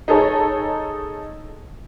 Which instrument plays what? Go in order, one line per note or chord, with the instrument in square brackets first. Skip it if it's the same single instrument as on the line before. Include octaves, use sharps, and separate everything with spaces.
[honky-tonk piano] D#4 G#4 A4 C#5 D#5